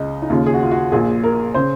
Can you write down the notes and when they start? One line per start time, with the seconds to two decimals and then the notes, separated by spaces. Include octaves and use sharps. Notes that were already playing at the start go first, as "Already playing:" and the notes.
Already playing: C#2 C#3 D#5
0.22 D#4
0.30 D#2 C#3 F4
0.46 G#4
0.54 F#4
0.63 F4
0.71 F#4
0.92 A#1 A#2 G#4
1.24 A#4
1.54 C#3 C5